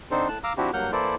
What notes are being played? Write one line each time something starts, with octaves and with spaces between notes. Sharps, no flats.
D3 C4 D4 D#4 A4 C5
A2 A5 F#6
F5 A#5 D6 E6
F3 C4 D4 E4 F#4 G4
G2 F#3 A#3 F#5 F6 G6
E3 A#3 E4 A4 C5 D5